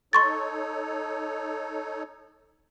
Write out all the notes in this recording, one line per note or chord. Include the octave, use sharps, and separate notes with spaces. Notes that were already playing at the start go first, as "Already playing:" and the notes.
D#4 A4 C#5 C6 C#6 A6